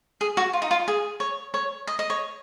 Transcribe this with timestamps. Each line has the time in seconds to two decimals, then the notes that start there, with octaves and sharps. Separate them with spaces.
0.21 G#4
0.37 F#4
0.53 F4
0.62 D#4
0.71 F4
0.88 G#4
1.20 C#5
1.54 C#5
1.87 D#5
1.99 D#5
2.10 C#5